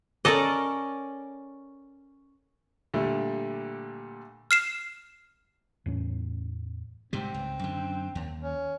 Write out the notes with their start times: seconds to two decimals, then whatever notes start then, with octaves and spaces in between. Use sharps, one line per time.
0.25 C#4 A4 A#4 D5 D#5
2.94 A#2 D3 G3 A3
4.51 F6 C7 E7
5.86 E2 A2 C#4
7.13 G#2 C3 G3 C4
7.34 C#2
7.59 F#2 D3
8.15 D#2
8.42 C#4